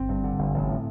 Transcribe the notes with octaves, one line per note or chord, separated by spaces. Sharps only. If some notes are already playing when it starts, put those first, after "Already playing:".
Already playing: G1 C4
G2
D3
G1
A1
A2